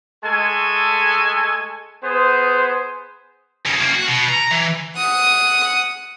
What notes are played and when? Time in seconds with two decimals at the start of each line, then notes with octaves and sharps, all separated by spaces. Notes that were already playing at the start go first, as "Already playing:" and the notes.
0.24 G#3 A3 A4 G#5
2.02 B3 G#4 C5
3.66 F2 C#3
3.80 F#2 A#3
3.94 F#4
4.08 B2
4.29 A#5
4.51 E3
4.97 F#5 D#6